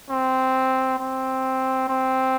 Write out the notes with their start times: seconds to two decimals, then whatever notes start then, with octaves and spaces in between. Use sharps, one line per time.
0.09 C4
0.99 C4
1.88 C4